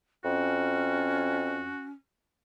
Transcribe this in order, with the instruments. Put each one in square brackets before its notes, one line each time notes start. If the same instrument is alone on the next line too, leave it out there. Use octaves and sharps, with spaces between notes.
[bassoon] F2 [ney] C#4 [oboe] F#4